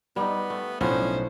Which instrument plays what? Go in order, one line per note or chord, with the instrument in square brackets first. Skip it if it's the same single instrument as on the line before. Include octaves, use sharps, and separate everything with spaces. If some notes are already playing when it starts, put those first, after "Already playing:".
[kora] G3 D#4 [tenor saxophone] B3
[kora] A3
[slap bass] B1 [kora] A2 F3 B3 [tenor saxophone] C#4 [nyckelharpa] D4 C5